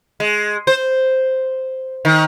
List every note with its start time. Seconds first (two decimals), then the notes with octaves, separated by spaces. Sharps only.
0.20 G#3
0.67 C5
2.05 D#3